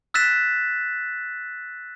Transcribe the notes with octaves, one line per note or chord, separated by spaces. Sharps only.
E6 F#6 A6 B6 E7